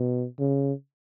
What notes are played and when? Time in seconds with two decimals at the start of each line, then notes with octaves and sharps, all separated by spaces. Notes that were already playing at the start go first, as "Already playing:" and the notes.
Already playing: B2
0.39 C#3